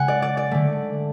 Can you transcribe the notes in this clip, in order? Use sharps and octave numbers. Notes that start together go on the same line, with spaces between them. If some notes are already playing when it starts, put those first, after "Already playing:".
Already playing: C#3 G#3 F#5 G#5
D5
D5
D5
D3 A3